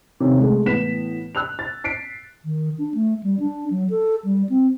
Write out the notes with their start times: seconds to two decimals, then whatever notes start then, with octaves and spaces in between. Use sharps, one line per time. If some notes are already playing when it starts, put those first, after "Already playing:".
0.20 C3 D#3 C#4
0.39 G#3 A3
0.66 A2 E3 B3 B6 E7
1.35 E6 F#6 F7
1.59 A6
1.84 B6 C7 D7
2.45 D#3
2.78 D4
2.94 A3
3.23 G3
3.40 D4
3.70 F#3
3.90 A4
4.25 G3
4.49 C4